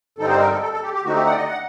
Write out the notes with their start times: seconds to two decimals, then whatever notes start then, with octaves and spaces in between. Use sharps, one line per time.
0.18 G2 D3 G3 C4 D#4 A4
0.29 C5
0.40 A#4
0.51 A4
0.61 A4
0.72 A4
0.83 G4
0.93 G4
1.05 D3 A3 C4 D#4 F#4
1.15 G4
1.26 F#5
1.31 D5
1.37 D#5
1.48 F#5